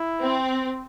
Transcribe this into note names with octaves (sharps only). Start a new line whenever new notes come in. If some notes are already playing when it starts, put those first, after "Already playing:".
Already playing: E4
C4